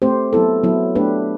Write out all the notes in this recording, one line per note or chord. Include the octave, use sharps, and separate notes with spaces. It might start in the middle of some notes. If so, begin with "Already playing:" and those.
A3 C4 G4 C5
F#3 B3 E4 A4
F#3 B3 E4
A3 D4 G4 B4